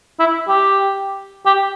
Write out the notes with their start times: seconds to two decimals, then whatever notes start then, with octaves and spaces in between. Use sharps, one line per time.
0.20 E4
0.48 G4
1.46 G4